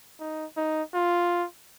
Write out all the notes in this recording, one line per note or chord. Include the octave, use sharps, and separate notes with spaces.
D#4
D#4
F4